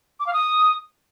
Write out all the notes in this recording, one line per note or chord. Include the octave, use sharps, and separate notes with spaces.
D6
F5
D#6